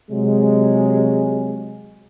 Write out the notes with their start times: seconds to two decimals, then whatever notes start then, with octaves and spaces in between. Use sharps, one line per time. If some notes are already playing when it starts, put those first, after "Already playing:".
0.11 C3 F#3 G#3